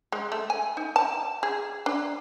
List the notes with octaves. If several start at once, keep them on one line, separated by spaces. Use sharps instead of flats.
G#3
A3
G#5
D#4
A5
G#4
D4